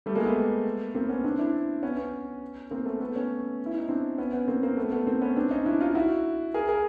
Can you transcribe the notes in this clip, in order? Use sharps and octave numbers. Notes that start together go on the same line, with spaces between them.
G3 A3
G#3 A#3
A3 B3
A#3 C4
B3 C#4
C4 D4
D4 E4
B3 C#4
B3 C#4
A#3 C4
A3 B3
A3 B3
B3 C#4
E4
D#4
C4 D4
B3 C#4
B3 C#4
A#3 C4
A#3 C4
A3 B3
A3 B3
A#3 C4
B3 C#4
C4 D4
C#4 D#4
D4 E4
D#4 F4
E4 F#4
G#4 A#4
G#4 A#4